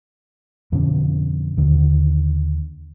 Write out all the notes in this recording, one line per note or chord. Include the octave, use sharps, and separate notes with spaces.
F2 B2 D3 C#4
D#2 D3